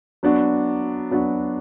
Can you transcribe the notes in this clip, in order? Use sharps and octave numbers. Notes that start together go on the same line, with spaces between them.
F#3 B3 D4 F#4
F#3 B3 D4 F#4